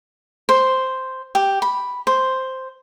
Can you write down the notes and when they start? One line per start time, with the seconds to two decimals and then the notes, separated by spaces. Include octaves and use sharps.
0.49 C5
1.35 G4
1.62 B5
2.07 C5